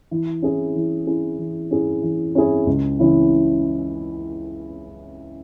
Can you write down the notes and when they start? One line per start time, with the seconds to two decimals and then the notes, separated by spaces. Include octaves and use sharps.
0.11 E3
0.42 C#4 E4 G#4
0.75 E3
1.06 C#4 E4 G#4
1.39 E3
1.71 C#4 E4 G#4
2.03 E3
2.35 C#4 E4 G#4
2.67 C#2
2.99 C#3 E3 C#4 E4